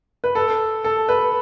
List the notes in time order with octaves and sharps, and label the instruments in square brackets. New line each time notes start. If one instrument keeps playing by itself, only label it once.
[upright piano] B4
A4
A4
B4